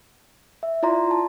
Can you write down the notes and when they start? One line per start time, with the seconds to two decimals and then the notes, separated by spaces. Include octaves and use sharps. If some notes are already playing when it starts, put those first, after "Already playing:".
0.63 E5
0.83 E4 F4 D5 A#5 C6
1.11 A5